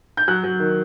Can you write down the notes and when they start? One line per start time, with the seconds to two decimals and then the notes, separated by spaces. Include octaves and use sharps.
0.17 G6
0.28 F#3 F#6
0.44 F#3
0.60 D#3